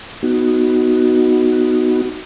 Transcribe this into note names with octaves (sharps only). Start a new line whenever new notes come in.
B3 D#4 F#4